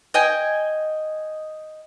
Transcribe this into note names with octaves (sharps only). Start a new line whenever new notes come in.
D#5 G5 G#5